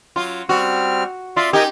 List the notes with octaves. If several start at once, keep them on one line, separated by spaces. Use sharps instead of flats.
F#3 F4
G3 C4 F#4 F6
F4 D5 E5 C6
D#4 G4 A#4 D#5 G#5